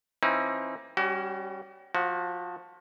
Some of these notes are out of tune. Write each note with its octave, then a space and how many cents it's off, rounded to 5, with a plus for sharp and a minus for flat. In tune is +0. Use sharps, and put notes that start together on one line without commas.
E3 +35 C4 +40 D#4 +40
G3 +0 C#4 +0 F#4 +35
F3 +20 F#4 +0